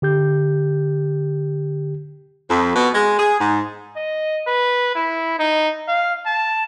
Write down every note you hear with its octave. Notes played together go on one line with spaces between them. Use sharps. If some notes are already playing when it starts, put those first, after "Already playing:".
D3 G4 G6
F2
B2
G#3
G#4
G#2
D#5
B4
E4
D#4
F5
A5